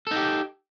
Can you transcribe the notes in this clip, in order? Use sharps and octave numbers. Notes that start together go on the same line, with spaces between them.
D#4 G4 A4